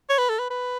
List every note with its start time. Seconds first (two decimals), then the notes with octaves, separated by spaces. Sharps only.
0.09 C#5
0.18 B4
0.29 A4
0.39 B4
0.50 B4